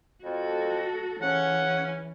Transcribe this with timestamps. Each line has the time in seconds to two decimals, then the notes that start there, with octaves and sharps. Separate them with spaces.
0.24 F2 F#4 A4
1.22 C#3 E3 C#4 F#5